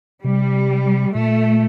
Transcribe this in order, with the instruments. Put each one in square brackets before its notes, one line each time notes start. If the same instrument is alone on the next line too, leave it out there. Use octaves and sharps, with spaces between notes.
[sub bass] C3 [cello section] G3
[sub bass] A#2 [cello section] A3